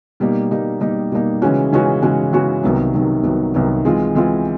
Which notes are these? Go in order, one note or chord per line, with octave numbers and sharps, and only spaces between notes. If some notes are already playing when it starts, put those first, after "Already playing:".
B2 G3 A#3 D#4
B2 G3 A#3 D#4
B2 G3 A#3 D#4
B2 G3 A#3 D#4
C#3 E3 G#3 C#4 F#4
C#3 E3 G#3 C#4 F#4
C#3 E3 G#3 C#4 F#4
C#3 E3 G#3 C#4 F#4
C2 C3 D#3 F#3 B3
C2 C3 D#3 F#3 B3
C2 C3 D#3 F#3 B3
C2 C3 D#3 F#3 B3
E3 G#3 C4 F4
E3 G#3 C4 F4